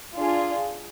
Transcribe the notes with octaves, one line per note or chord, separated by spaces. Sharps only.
D4 F4 G#4